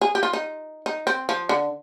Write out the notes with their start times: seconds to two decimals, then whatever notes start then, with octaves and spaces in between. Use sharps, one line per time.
0.02 G#4
0.15 G4
0.23 F4
0.33 D#4
0.86 D#4
1.07 C4
1.29 F3
1.49 D3